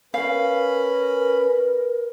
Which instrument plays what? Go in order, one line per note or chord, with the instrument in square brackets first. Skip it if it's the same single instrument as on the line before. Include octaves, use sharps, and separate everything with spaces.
[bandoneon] C#4 B5 [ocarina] A#4 [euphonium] B4 [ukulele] F5